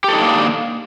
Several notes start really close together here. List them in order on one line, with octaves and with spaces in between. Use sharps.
G4 A4 D#4 D4 A#3